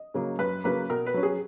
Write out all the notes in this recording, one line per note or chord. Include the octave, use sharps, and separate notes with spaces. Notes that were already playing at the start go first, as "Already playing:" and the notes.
Already playing: D#5
C#3 F#3 A#3
F#2 B4
C#3 F#3 A#3 B4
B2 A#4
B4
F#3 C#4
G#4